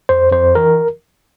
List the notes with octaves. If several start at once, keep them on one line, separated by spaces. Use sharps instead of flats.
F2 C5
F2 C5
E3 A#4